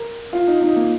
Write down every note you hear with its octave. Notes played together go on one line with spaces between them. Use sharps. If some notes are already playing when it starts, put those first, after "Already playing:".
Already playing: A#4
F4
D#4
D#4
A#3